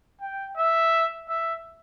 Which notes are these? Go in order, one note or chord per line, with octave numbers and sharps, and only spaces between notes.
G5
E5
E5